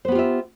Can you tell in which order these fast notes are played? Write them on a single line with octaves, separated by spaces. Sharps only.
C5 B3 G4 F4 E5